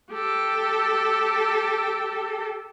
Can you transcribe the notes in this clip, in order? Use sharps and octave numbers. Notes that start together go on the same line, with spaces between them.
G4 A4